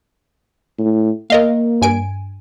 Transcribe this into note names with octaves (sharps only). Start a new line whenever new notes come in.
A2
A#3 A#4 D#5 F5
G2 G#5 D7